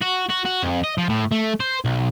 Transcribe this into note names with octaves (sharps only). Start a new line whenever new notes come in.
F#4
F#4
F#4
F2
D#5
F3
A2
A3
C5
B1